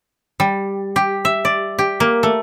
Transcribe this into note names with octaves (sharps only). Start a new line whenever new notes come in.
G3
G4
E5
D5
G4
A#3
A3